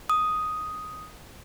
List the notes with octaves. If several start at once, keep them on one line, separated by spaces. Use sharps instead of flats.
D#6